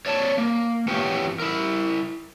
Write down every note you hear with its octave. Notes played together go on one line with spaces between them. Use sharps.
C#5 D5 A5
A#3
E3 B3 C#4 F4 G4
E4 A#4